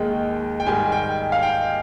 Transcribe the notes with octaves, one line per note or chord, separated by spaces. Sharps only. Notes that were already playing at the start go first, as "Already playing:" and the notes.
Already playing: D#2 D#3 G#3 G5
G5
G#2 D#3 G3 G#5
G5
F5
G5